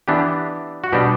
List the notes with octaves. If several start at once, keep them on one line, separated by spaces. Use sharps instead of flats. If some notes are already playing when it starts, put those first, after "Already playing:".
E3 B3 D4 G4
F#4
B2 G3 D4 G4